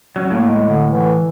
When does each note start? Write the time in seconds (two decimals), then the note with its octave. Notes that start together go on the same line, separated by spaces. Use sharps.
0.16 F#3 C#4
0.30 A2 A#3
0.47 G#3
0.67 D3
0.92 E3